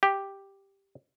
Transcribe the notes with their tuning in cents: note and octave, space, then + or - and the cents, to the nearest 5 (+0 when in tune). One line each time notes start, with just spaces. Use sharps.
G4 +0